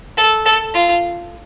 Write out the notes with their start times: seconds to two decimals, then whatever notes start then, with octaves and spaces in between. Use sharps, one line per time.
0.17 A4
0.45 A4
0.74 F4